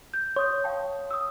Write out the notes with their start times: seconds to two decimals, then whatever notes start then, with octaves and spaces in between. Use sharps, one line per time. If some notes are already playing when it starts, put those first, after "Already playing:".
0.14 G6
0.36 C#5 C6 D#6 G6
0.64 F5 G5 A5
1.11 D#6 E6